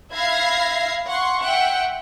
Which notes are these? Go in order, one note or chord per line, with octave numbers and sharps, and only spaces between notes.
E5 F5 B5 G#6 A#6 C7
F#5 C6 C#6
E5 F#5 G5